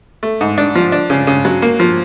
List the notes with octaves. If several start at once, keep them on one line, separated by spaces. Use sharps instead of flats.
A3
G#2
D4
F3
D4
C#3
C#3
F#3
A#3
F3